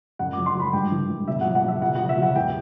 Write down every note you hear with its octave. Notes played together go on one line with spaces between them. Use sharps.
F#2 F#5
F#3 D6
C6
F#3 B5
G2 G5
E3
G2
B2 E5
F#3 F#5
F#5
F#3 E5
B2 F#5
F#3 F#5
E5
F#3 F#5
E2 G5